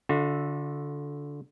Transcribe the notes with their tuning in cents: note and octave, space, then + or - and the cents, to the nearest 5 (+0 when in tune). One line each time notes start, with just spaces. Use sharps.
D3 -15 F#4 -45 E5 +0